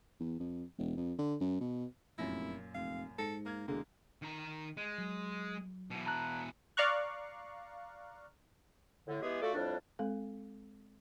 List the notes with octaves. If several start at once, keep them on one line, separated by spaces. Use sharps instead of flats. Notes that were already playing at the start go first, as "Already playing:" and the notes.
E2
F2
E1
F2
D3
F#2
B2
F1 F#2 A#2 E4 A#6
F1 F5
G#2 A4 A#6 C#7
A#3 F6 G#6
E1 D3 G#3 A#3
D#3 A#5
G#3
F#3
B2 E3
A5 A#5 F#6
D5 F5 A#5 C#6 F#6
A2 D3
E3 G#3 B3 G4 G#4
A3 F4 F#4 A4 D5
F2 A2 G3 D4
G#3 C4 A4 F5